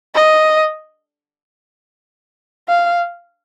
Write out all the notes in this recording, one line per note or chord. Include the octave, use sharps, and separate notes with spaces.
D#5
F5